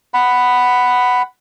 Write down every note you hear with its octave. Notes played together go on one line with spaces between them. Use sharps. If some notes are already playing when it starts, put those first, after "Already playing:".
F#5 B5